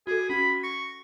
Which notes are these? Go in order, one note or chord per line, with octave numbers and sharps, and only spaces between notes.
F#4 G#4 A4
C#4 F#4 B5
C#6 A#6